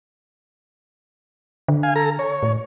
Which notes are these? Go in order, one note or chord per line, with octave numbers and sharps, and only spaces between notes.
D3
F5 G#5
A4 A#5
C#5
A2